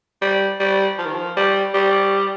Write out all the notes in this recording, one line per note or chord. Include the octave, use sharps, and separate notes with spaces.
G3
G3
F3
D#3
F3
G3
G3